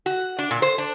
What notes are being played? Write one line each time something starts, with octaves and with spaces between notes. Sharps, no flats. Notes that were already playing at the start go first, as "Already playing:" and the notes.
F#4
D4
A#2
C5
D4